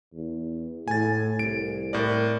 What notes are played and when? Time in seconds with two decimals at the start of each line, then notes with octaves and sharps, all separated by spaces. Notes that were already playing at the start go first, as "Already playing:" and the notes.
0.14 E2
0.88 A2 G#5 A6
1.39 C2 D7
1.93 A2 A#4 D5